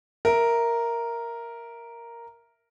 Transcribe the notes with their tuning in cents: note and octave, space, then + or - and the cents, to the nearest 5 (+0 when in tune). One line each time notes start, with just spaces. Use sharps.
A#4 +0 E5 +0